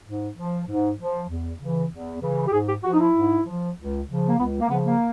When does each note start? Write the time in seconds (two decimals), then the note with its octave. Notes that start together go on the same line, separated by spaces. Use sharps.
0.06 G#2
0.37 F3
0.67 G#2
0.99 F3
1.30 E2
1.60 C#3 E3
1.91 E2
2.22 C#3 E3
2.48 G4
2.53 G#2 G#4
2.69 G4
2.84 F3 F#4
2.94 D#4
3.00 E4
3.15 G#2
3.46 F3
3.78 C#2
4.09 C#3 F3
4.28 A#3
4.39 C#2 B3
4.61 A#3
4.70 C#3 F3 B3
4.85 A#3